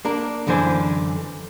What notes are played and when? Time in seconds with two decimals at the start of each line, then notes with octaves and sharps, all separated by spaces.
0.05 A#3 D4 A#4
0.47 F#2 D3 E3 D4 C5 G#5